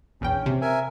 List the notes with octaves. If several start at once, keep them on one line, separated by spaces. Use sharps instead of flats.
A#1 E2 C#4 G5
C3
A#4 E5 G#5